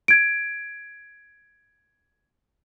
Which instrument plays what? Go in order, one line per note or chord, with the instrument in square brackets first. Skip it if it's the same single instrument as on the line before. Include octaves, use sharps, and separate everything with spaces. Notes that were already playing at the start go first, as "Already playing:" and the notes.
[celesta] G#6 D7